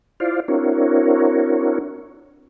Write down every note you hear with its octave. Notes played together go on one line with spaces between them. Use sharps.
E4 F4 C5 D5 F5
C4 D4 E4 F#4 A#4 C#5